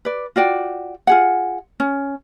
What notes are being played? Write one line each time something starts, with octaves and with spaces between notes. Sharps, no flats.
B4 D5
F4 F#4 D5 G5
F4 G#4 F#5
C#4